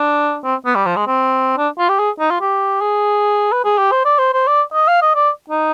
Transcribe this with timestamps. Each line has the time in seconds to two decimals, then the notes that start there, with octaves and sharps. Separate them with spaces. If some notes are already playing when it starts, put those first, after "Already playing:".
Already playing: D4
0.44 C4
0.65 B3
0.75 G3
0.86 F3
0.96 G#3
1.07 C4
1.58 D4
1.78 F4
1.89 G4
1.99 G#4
2.20 D#4
2.31 F4
2.41 G4
2.81 G#4
3.52 B4
3.65 G#4
3.78 G4
3.92 C5
4.05 D5
4.19 C5
4.33 C5
4.47 D5
4.74 D#5
4.88 F5
5.02 D#5
5.15 D5
5.50 D#4